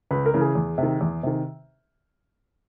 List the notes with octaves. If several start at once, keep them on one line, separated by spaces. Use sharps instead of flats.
C#2 B4
A#4
C#3 E3
G#4
E2
C3 D#3
E2
C3 D#3